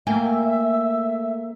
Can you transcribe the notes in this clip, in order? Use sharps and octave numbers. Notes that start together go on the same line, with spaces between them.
A3 A#3 E5 G5 G#5